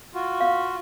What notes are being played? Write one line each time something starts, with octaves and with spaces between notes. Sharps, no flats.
F4 F#4
F5